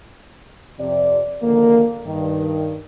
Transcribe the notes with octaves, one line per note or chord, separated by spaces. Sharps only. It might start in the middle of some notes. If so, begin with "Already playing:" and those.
F2 C3 D5
D3 D#3 F3 A#3
G2 D#3